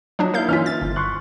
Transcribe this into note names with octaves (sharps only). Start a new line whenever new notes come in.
F3 F#3 D4 D#4
A#3 D#4 E4 A#4 F5 G6
E3 C#4 F4 F6 B6
A6
G1
C6 C#6 F#6